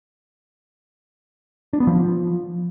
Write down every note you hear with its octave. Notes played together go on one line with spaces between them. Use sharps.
D4
B3
F3